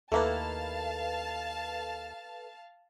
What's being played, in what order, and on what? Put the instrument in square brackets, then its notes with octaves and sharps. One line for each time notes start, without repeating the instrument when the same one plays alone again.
[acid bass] D#2 [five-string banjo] A3 A#3 E4 [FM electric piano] A4 B4 [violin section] F5 A5